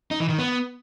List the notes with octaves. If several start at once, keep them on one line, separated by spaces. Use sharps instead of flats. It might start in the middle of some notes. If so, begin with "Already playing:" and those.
D#4
E3
D#3
B3